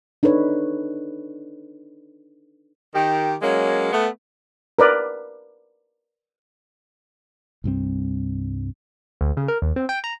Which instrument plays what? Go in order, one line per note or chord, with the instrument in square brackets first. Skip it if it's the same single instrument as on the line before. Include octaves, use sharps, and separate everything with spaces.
[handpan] D4 D#4 A4 B4 C#5
[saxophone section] D#3 G4
F#3 G#3 A#3 C#4
A3 B3
[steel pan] A#4 B4 D5
[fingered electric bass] C2 G2 E3 C4
[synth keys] D2
C#3
A#4
D#2
C4
G5
A#5